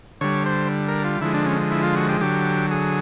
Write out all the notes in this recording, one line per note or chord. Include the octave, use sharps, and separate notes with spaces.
D3 G3 C#5
C5
A#4
F4
D3 F3 G#3 E4
D4
C#4
E4
F4
F#4
G4
D3 F#3 G4
G#4